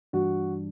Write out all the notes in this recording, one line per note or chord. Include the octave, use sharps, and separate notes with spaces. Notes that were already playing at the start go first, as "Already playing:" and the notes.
G2 E3 G3 D4 F#4